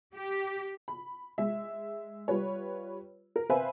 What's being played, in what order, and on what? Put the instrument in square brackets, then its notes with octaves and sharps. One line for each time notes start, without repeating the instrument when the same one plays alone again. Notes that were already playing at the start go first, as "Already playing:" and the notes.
[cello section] G4
[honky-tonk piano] B5
G#3 E5
G3 F4 B4 C#5
A#4
C4 B4 C5 E5 F5 G#5